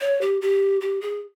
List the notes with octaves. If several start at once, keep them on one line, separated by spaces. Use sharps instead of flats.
C#5
G4
G4
G4
G#4